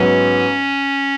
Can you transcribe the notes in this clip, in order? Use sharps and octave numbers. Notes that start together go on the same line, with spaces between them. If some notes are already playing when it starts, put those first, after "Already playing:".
Already playing: G#2 F#3 B3 C#4